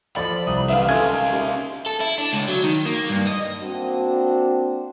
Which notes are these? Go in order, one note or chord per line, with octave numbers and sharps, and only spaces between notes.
F3 A4 D5 B5
C2 D#6
D3 E3 B3 E5 F5
A3 C#4 F4 G#5 F6 G#6
D#3
D#2
A4
E4
D4
C#2
F#3
D#3
A#3
G2
D#5
A#3 C4 D4 F#4